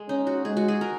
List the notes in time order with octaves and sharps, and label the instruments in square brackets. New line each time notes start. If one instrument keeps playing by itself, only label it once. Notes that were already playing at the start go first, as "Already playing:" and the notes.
Already playing: [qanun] G#3
[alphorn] C#4 [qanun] D#4
[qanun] F#4
[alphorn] G#3 [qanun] G#4
[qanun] F#4
G#4
A#4